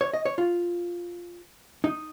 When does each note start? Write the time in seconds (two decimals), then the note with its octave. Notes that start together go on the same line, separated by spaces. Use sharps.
0.01 C#5
0.14 D#5
0.25 C#5
0.38 F4
1.84 D#4